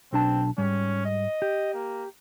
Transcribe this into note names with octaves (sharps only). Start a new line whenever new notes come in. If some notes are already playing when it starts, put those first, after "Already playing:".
B1 C4 D4 A5
G#2 G3 C#4
D#5
G4
A#3